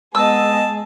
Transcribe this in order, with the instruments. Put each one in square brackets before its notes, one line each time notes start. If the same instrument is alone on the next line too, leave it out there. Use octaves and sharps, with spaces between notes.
[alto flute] G#3 [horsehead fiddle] B3 D#5 [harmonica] G#4 A5 [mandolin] E6